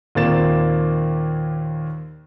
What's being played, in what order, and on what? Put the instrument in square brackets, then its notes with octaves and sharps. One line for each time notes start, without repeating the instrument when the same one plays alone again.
[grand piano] D#2 A#2 A#3 C4 A6 E7